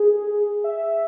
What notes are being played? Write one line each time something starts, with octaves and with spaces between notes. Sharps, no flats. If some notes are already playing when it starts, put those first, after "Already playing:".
Already playing: G#4
E5